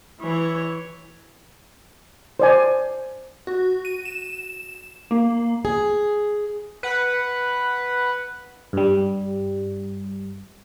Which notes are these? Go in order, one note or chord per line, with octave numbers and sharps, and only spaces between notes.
E3 C#5
C5 D5 G#5
F#4
D#7
E7
A#3
G#4
B4 F#5
G2 G3